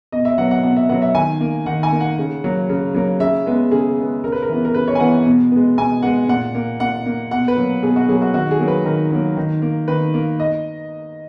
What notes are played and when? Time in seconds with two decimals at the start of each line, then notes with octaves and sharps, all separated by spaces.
0.12 B2 D#5
0.25 E5
0.38 F#3 B3 F#5
0.51 F#5
0.63 B2 F#5
0.76 E5
0.89 F#3 B3 F#5
1.02 E5
1.15 D#3 G#5
1.41 A#3
1.66 D#3 F#5
1.83 G#5
1.92 A#3
2.00 F#5
2.19 C#3
2.44 F#3 A#3
2.69 C#3
2.94 F#3 A#3
3.20 C#3 E5
3.46 G#3 B3
3.71 C#3 G#4
3.98 G#3 B3
4.24 C#3 A#4
4.32 B4
4.42 A#4
4.49 E3 B3
4.65 A#4
4.74 C#3 B4
4.88 C#5
4.95 G#5
5.00 E3 B3 F#5
5.26 B2
5.52 G#3 B3
5.78 B2 G#5
6.02 G#3 B3 F#5
6.29 A#2 F#5
6.55 A#3
6.80 A#2 F#5
7.06 A#3
7.31 B2 F#5
7.48 B4
7.57 F#3 A#3
7.83 B2 G#4
7.96 F#4
8.08 F#3 A#3 G#4
8.22 F#4
8.34 D#3 F#4
8.51 G#4
8.60 F#3 A#3
8.68 B4
8.85 D#3 A#4
9.12 F#3 A#3
9.37 D#3
9.62 A#3
9.88 D#3 B4
10.14 A#3
10.40 D#5